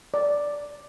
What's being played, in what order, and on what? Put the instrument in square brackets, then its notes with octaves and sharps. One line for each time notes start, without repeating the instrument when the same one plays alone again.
[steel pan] D5